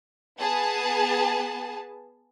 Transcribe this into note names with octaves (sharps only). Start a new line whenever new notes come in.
B3 G#4 A5